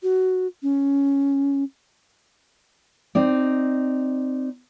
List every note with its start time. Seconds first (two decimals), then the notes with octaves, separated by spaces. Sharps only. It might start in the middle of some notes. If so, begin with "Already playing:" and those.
0.03 F#4
0.63 C#4
3.15 C4 D#4 D5